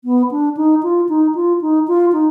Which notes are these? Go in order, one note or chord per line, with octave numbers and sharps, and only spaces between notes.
B3
D4
D#4
F4
D#4
F4
D#4
F4
D#4